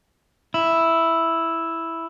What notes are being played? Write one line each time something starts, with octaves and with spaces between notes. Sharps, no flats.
E4